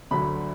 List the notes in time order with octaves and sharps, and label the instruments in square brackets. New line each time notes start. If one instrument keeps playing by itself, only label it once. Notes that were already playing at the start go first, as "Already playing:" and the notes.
[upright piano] D2 D3 F#3 B5